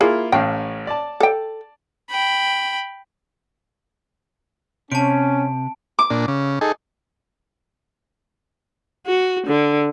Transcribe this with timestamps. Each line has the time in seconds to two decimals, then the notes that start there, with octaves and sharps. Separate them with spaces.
0.01 A#3 E4 F4 G#4
0.32 A1 A2 F5 G5
0.87 D5 A5
1.20 A4 G5
2.11 G5 B5
4.92 C3 C#4 A5 D7
5.99 D6
6.10 A#2 D4
6.28 C#3
6.61 D#4 G#4 A4
9.07 F#4
9.47 D3